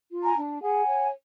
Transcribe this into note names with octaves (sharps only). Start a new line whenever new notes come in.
F4
G#5 A#5
D4
G#4 F#5 G#5
C#5